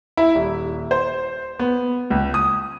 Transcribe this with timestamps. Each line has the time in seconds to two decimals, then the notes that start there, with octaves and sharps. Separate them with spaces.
0.17 E4
0.35 D#1
0.91 C5
1.59 B3
2.10 C#2
2.34 D#6